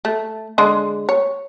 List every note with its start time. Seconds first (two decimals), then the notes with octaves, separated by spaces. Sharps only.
0.05 A3
0.58 D3 G#3 G#4
1.09 C#5